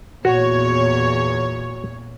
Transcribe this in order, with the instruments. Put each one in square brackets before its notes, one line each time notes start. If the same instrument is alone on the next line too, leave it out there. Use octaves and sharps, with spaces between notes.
[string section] E2 C#5 [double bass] A#2 [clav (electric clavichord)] F#4